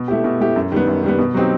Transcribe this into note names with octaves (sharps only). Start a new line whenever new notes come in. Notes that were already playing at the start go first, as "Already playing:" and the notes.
Already playing: B2
A3 E4 G4
B2
A3 E4 G4
F#2
D#3 G3 B3
F#2
D#3 G3 B3
B2
F#3 C4 D#4 G4